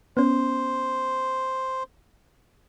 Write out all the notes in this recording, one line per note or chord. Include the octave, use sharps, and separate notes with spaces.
B3 C#4 C5